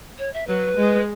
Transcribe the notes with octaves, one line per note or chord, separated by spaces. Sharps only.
C#5
E5
F#3 B4
G#3